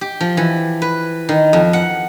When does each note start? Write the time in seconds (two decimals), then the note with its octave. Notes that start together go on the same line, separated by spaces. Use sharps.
0.01 G4
0.21 F3
0.37 E3
0.82 B4
1.29 D#3
1.53 F2
1.73 F#5